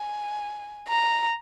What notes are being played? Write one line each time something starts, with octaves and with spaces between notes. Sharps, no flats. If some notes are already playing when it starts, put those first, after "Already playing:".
Already playing: G#5
A#5